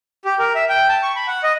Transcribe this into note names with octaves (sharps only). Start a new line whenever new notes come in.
G4
A#4
E5
G5
A5
C#6
B5
F#5
D#5